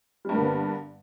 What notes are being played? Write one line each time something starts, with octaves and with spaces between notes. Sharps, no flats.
G2 D3 G3 A#3 B3